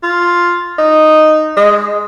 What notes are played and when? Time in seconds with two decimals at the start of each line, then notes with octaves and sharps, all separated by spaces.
0.03 F4
0.79 D#4
1.57 G#3